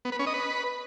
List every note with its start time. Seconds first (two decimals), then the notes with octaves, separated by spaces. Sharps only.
0.05 B3
0.12 B4
0.19 C#4
0.27 D#5
0.34 B4